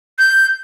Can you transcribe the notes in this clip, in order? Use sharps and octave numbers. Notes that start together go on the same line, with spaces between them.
G6